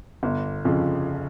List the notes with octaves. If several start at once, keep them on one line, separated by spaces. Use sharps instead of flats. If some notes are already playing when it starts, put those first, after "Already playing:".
G1
F2 C#3 F3